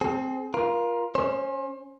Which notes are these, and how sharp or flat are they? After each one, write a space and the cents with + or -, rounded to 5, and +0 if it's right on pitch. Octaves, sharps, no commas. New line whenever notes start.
C4 +0 G#4 +40
F4 +0 A#4 +30
C#4 +0 C5 +35